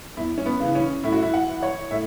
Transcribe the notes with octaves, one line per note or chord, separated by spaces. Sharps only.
E2 E4
C#4
B3
C#3 E3
C#4
A2 E4
F#4
E4
F#5
E3
C#5
A2 E5